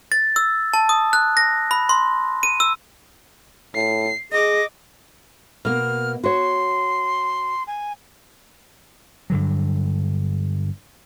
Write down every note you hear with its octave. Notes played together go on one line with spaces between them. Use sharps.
A6
E6
A5
D#6
F#6
A#6
B5
C6
D#7
E6
A2 C7
G#4 D#5 D6 A#6
B2 A#3 F6
F#4 C#5 C6
G#5
G2 D3 F#3